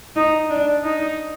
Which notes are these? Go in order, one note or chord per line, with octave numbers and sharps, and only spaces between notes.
D#4
D4
D#4